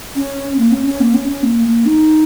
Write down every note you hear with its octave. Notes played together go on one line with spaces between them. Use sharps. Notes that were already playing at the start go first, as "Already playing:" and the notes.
C#4
A#3
C#4
C#4
A#3
C#4
C#4
A#3
A#3
D#4